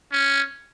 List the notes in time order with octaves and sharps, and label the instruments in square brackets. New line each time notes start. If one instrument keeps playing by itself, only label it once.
[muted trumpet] C#4